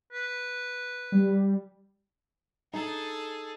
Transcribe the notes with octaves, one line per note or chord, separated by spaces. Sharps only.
B4
G3
D#4 G#4 A4